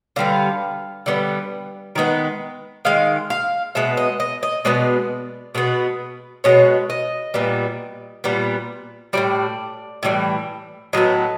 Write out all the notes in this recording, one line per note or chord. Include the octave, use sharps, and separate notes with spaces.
D3 G3 B3 F5
D3 G3 B3
D#3 G#3 B3
D#3 G#3 F5
F5
B2 G#3 B3 E5
D#5
D#5
D#5
B2 G#3 B3 D5
B2 G#3 B3
B2 G#3 B3 C#5
D#5
A#2 G3 B3
A#2 G3 B3
A2 E3 G3 D5
A2 E3 G3
A2 F#3 B3 D#5